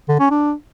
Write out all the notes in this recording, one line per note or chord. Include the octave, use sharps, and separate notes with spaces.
D3
C#4
D4